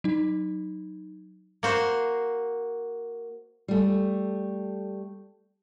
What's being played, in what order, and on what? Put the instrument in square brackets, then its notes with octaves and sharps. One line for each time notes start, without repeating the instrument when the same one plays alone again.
[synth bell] F#3 D#4
[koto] A#3 F#4 C5
[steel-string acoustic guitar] G3 A3